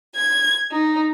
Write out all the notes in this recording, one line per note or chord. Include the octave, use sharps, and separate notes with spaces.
G#6
D#4